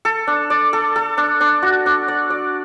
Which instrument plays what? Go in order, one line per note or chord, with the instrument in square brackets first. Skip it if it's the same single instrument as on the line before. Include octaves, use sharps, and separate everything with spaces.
[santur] A4
D4
D5
A4
A4
D4
D4
F#4
D4
D5
D5